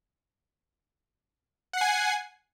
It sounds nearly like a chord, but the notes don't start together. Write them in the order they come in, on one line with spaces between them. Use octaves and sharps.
F#5 C7 G#5